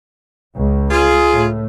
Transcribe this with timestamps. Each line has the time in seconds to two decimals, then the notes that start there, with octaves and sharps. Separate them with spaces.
0.56 C#2
0.91 F4 G#4
1.33 A2